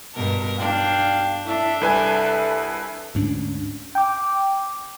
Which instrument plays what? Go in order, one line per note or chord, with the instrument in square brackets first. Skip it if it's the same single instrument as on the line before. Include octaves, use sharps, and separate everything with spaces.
[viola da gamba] G2 B2 A#4
[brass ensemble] B1 F5 G5 [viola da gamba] D4
[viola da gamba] D4 [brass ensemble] E4 A4 E5
[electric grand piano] C2 B4 G#5 [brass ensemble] A4 E5
[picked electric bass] D2 G#2 C#4 D4
[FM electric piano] G5 D6